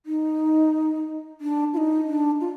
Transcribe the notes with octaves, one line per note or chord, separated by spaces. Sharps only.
D#4
D4
F4
D#4
D4
F4